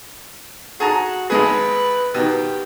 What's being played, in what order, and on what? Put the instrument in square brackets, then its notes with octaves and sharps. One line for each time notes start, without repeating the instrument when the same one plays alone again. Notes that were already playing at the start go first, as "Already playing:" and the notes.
[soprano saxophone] F#4 [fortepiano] G#4 A5 A#5
[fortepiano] G#1 G#3 G#4 [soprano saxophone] B4
[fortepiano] B2 D#3 [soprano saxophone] G4